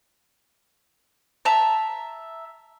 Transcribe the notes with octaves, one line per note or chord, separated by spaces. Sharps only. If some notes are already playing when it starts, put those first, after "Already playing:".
E5 A5 A#5